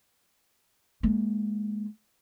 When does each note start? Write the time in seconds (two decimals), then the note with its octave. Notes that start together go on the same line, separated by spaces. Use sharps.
1.03 G#3 A#3